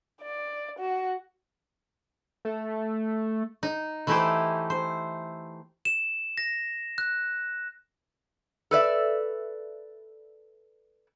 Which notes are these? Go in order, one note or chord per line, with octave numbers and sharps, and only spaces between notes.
D5
F#4
A3
D#4
E3 A3 D#4 E4 G4 C5
C5
E7
A#6
F#6
A4 B4 D5 E5